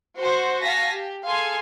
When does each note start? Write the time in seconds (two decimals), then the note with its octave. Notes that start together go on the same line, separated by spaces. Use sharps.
0.17 F#4 C5
0.62 F#4 F5 G#5 A5 A#6 B6
0.93 G4
1.26 G#4 A4 F5 G#5 C6